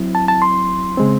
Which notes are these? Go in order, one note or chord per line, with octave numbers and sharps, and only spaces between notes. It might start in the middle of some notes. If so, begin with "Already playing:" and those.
Already playing: F#3 C4 E4
A5
A5
C6
C#3 G#3 C4